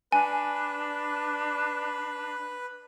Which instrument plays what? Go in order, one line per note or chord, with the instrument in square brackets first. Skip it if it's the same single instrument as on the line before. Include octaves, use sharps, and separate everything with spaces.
[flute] D4 [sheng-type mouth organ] B4 [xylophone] G#5